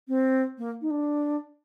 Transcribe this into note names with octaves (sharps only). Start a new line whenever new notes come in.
C4
A#3
D#4
D4